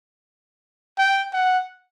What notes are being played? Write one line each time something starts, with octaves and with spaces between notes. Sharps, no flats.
G5
F#5